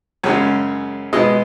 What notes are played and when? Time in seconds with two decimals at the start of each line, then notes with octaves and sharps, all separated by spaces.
0.23 F#2 C#3 G#3 C#4 C#5
1.13 B2 G#3 B3 D#5